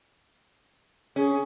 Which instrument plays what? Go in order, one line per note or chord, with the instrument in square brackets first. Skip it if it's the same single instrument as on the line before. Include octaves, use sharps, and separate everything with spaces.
[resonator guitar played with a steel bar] C#4 [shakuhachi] G#4